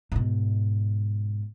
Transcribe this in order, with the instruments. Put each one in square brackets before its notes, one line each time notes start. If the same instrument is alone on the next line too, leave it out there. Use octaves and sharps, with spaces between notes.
[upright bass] G#2 B2